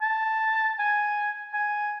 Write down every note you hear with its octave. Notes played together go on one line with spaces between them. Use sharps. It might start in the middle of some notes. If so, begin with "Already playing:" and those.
A5
G#5
G#5